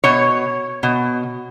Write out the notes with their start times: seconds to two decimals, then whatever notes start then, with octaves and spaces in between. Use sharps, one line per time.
0.04 B2 C#5
0.83 B2